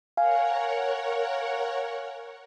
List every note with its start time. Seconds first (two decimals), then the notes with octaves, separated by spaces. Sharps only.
0.17 A#4 C#5 F5 F#5 G#5